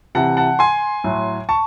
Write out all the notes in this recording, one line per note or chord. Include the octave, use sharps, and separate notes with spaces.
C3 E3 F#5 A5
F#5 A5
G#5 C6
A2 F#3
A5 C#6